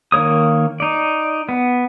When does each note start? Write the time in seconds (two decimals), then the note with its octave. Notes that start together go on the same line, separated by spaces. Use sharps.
0.12 D#3 A#3 C#5 D#6
0.80 D#4 D5
1.49 B3